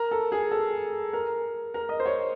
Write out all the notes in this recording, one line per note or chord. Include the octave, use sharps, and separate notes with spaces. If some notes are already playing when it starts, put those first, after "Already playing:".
Already playing: A#4
A4
G#4
A4
A#4
A#4
D#5
C5
C#5